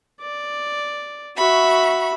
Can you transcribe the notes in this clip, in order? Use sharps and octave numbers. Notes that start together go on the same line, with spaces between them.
D5
F#4 E5 B5 C#6